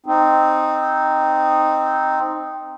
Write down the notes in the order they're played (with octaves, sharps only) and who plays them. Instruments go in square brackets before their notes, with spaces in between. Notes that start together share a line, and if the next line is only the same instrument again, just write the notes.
[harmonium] C4 D#4